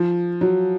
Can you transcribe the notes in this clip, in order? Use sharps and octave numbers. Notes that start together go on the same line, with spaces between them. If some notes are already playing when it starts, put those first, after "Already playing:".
Already playing: F3
F#3